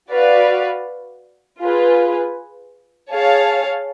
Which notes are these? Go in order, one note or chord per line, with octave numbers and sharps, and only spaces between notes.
F#4 B4 D5 F5
F4 G#4 B4
G#4 C#5 F5 A5